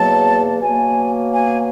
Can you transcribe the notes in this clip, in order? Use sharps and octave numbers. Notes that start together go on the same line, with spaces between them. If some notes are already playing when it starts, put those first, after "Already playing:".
Already playing: E2 B2 F#3 A#3 A5
B2 F#3 A#3 G#5
G#5